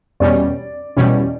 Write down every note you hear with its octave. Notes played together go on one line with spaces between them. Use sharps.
E2 B2 G3 C#4 D5
E2 B2 G3 C#4